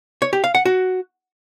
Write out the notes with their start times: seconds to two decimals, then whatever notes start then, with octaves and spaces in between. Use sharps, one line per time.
0.22 C#5
0.33 G4
0.44 F5
0.55 F#5
0.65 F#4